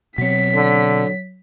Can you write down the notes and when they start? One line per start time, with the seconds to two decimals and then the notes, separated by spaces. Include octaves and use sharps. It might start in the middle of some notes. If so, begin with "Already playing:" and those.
0.18 B2 F#3 C4 C#5 B6
0.54 D3